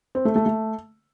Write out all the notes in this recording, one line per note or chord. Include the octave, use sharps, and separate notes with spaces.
C4
A3
A3
A3